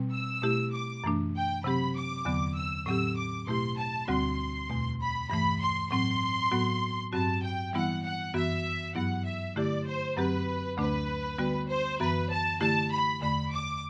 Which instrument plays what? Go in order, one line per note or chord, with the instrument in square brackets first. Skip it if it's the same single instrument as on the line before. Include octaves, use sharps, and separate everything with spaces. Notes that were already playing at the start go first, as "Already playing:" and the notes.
Already playing: [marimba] B2 G3 C4
[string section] E6
[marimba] B2 A3 E4 G4
[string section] D6
[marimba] F#2 E3 A3 D4
[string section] G5
[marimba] C3 F#3 C4 G4 [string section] B5
[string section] D6
[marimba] E2 D3 F#3 B3
[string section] E6
[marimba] A2 F#3 C4 G4 [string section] E6
[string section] D6
[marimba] B2 A3 E4 G4 [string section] C6
[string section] A5
[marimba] D2 D3 G3 C4 F#4 [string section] C6
[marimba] E2 B2 A3
[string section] B5
[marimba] G2 E3 A3 [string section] B5
[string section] C6
[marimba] A2 F#3 C4 [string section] C6
[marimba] A2 F#3 B3 F#4
[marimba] G2 F#3 C4 F#4 [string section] A5
[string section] G5
[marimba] E3 G3 B3 E4 [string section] F#5
[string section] F#5
[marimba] F#2 E3 B3 F#4 [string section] E5
[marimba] G2 F#3 B3 E4 [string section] F#5
[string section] E5
[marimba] D3 A3 E4 G4 [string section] D5
[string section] C5
[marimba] F#2 F#3 C4 G4 [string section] B4
[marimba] D2 D3 A3 D4 [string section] B4
[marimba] D3 G3 B3 F#4
[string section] C5
[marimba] F#2 E3 B3 F#4 [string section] B4
[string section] A5
[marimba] D3 A3 E4 G4 [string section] A5
[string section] B5
[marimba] E2 D3 A3 [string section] B5
[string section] D6